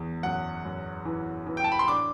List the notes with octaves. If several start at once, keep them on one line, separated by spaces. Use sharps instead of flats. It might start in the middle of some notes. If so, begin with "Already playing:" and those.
Already playing: E2
F#2 F#5
F#2
E3
E3
G5
A5
B5
C6
D4 D6